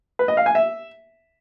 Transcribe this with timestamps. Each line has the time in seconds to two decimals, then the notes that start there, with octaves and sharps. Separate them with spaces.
0.19 B4
0.28 D#5
0.37 F5
0.46 G#5
0.55 E5